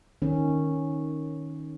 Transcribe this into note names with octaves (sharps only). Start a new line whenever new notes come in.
D#3 C#4